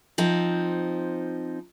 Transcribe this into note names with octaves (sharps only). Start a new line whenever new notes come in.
F3 C4 D#4